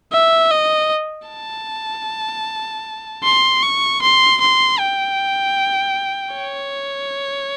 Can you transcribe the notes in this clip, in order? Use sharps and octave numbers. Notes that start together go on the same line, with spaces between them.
E5
D#5
A5
C6
C#6
C6
C6
G5
C#5